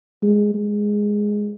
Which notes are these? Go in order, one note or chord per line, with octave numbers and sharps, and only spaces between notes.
G#3
G#3